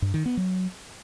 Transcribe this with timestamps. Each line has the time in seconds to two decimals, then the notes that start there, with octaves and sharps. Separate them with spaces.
0.02 G2
0.14 D#3
0.26 B3
0.37 F#3